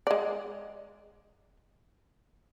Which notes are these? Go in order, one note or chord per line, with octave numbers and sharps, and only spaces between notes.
G#3 D5